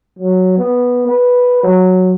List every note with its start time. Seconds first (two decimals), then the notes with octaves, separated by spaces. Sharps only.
0.19 F#3
0.58 B3
1.07 B4
1.63 F#3